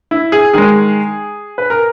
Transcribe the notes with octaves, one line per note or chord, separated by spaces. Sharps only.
E4
G#4
D#3 G#3 G#4
B4
A#4